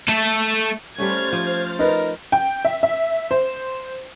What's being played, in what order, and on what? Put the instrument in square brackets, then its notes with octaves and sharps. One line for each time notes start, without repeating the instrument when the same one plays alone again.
[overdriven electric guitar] A3 A4
[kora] G3 A3 C#4 [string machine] C5 F6 A6 [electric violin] G#6
[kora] F3
[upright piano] D#4 B4 [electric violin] A#4
[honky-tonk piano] G5
E5
E5
C5